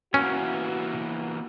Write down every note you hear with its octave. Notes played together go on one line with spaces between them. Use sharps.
E3 A#3 B3 C#4 F#4